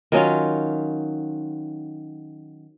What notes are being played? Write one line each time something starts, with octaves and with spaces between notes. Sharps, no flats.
D#3 F#3 C#4 F4